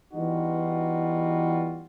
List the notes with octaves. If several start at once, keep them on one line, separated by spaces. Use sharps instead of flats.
E3 G3 B3 D#4 F4 F#4